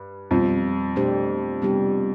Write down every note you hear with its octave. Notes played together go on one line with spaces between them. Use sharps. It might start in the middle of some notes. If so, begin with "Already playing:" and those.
Already playing: G2
F2 B2 F3 G3 B3
B2 A3 D4 G4 C5
C3 G3 B3 D4 G4